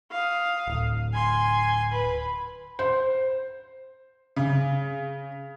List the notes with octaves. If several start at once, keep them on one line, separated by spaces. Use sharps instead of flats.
F5 D#6
D1
G#5 C6
B4
C5
C#3